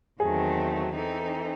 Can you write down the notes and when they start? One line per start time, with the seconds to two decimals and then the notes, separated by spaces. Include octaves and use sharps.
0.20 E2 D#3 F#3 A3 C4 G#4
0.93 E3 C4 D#4 A4